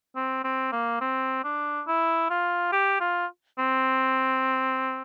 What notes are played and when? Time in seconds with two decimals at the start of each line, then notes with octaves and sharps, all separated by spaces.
0.16 C4
0.44 C4
0.72 A#3
1.01 C4
1.44 D4
1.87 E4
2.30 F4
2.72 G4
3.01 F4
3.59 C4